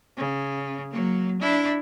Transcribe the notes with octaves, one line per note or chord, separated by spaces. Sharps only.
C#3
F#3 A#3
D4 E4